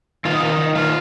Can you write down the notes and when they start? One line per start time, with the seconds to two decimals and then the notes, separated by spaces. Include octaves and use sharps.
0.25 D#3 F4
0.33 D#4
0.41 D#3 F4
0.50 D#4
0.58 D#3
0.75 D#3 F4